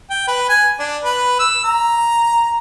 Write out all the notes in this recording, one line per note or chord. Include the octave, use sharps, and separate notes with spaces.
G5
B4
G#5
D4
B4
E6
A#5